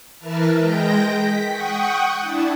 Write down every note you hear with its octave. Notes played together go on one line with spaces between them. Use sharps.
E3 A#4 B4 E5 A5 F6
G#3 G5 G6 A#6
B6
F#5 G5 C#6 D#6
D4 E4 A5